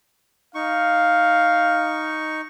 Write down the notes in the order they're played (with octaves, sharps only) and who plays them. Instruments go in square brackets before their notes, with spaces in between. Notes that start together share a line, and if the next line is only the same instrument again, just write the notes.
[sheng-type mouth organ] D#4 C#6 [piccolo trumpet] F5